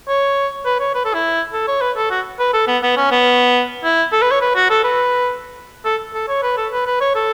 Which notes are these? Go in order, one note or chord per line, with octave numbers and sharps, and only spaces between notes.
C#5
B4
C#5
B4
A4
E4
A4
C#5
B4
A4
F#4
B4
A4
B3
B3
C#4
B3
E4
A4
B4
C#5
B4
F#4
A4
B4
A4
A4
C#5
B4
A4
B4
B4
C#5
A4